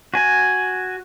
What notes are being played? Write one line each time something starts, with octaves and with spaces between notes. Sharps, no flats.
F#4 G#5